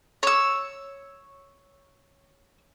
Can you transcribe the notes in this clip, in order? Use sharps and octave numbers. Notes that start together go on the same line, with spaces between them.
C#5 E6